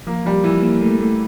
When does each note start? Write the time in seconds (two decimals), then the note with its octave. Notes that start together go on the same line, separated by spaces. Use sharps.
0.07 F3 A#3
0.25 F3 G3
0.44 E3 F3
0.63 A#3
0.81 A3
1.01 A3